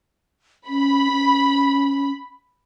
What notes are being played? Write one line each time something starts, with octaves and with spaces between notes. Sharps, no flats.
C#4 B5
C#4